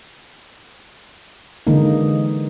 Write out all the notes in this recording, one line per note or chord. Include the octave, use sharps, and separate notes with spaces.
D3 E3 G#3 A#3 D#4